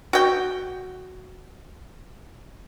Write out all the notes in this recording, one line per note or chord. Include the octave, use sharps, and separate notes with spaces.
F#4 G5